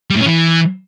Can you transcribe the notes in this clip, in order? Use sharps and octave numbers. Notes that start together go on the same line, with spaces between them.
G3
A2
C#4
E3